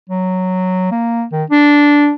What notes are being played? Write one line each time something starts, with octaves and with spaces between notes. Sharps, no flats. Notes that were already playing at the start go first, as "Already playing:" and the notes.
F#3
A#3
D#3
D4